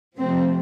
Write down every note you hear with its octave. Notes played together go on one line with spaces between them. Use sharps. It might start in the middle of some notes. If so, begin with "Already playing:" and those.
C3 F3 A3 C4